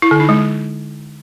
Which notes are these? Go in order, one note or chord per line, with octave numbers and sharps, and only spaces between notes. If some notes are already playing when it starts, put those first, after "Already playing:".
E4
D3
D#4
G#3